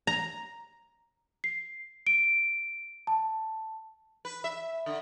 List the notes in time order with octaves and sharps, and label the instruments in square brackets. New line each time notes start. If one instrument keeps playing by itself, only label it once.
[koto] A#5
[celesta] C7
D7
A5
[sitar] B4
E5
D3